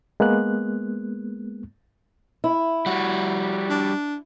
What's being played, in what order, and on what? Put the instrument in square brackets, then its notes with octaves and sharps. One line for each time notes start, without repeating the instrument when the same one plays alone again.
[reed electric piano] G#3 A#3 B3 F#6
[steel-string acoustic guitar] E4
[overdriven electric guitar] G3 F#4
[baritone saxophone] D4